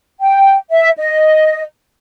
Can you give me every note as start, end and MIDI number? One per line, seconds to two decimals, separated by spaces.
0.20 0.55 79
0.70 0.89 76
0.98 1.61 75